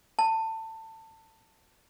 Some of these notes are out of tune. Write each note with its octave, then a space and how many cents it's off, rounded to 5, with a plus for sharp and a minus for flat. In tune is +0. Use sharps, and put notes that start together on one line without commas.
A5 +20